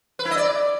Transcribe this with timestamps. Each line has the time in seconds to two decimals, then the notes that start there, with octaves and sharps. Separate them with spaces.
0.19 B4
0.25 E4
0.31 D#5
0.37 D5